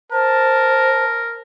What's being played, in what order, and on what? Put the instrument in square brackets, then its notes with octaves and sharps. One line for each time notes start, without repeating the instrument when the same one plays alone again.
[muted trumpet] A#4 [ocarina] C5 [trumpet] A5